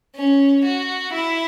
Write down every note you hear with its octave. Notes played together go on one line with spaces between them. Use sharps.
C#4
F#4
E4